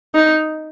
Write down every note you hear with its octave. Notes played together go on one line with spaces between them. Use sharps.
D#4